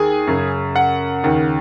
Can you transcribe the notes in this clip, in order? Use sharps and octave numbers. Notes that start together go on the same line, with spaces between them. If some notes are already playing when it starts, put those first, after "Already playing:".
Already playing: D#2 G#4 G#5
F#2 C#3
F#5
D#2 C#3